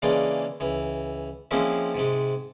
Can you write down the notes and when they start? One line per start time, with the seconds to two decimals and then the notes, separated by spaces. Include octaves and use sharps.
0.02 C#3 E3 G#3 A#3 D4
0.60 C#2 E3
1.51 F3 G#3 A#3 C4 C#4 E4
1.95 G#2 C3 G#3